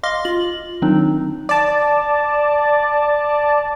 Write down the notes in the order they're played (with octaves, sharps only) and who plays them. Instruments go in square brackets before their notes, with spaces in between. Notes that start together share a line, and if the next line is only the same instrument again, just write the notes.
[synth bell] D#5 F5 C6 D6 F6 A#6
F4 F#7
D#3 F#3 C4 D4 D#4
[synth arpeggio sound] D5 A5